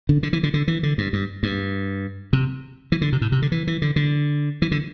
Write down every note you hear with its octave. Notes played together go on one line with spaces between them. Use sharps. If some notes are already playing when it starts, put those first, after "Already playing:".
D3
D3
E3
D3
D3
E3
D3
G2
G2
G2
C3
E3
D3
C3
A2
C3
D3
E3
E3
D3
D3
E3
D3